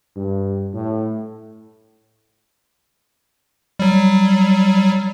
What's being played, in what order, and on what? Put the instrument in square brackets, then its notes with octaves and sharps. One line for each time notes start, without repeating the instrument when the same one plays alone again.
[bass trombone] G2
A2
[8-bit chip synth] F#3 G3